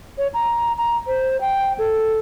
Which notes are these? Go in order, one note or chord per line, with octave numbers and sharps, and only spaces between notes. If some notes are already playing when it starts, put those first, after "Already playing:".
C#5
A#5
A#5
C5
G5
A4